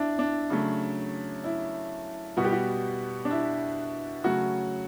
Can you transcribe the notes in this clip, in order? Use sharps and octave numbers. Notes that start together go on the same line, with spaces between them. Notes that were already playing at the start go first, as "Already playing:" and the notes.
Already playing: D4 E4
D4
C#3 F#3 A3
E4
B2 G3 B3 F#4
G4
F#4
D4
E4
C#3 F#3 A3 F#4